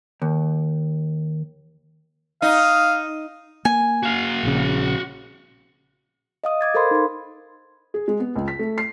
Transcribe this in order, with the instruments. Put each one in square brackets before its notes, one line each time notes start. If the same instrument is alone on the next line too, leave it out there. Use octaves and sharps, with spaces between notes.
[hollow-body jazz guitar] D#2
[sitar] D#4 [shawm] F5
[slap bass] A#3 [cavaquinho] G#5
[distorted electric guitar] F#4 F5
[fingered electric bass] A#1 C#3
[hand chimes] D#5 F5 D#6
D6 G#6 A6
A4 A#4 C5 F5 B5 C6
D#4 C6
[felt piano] G#4
G#3
B3
C#2
B6
A3
C7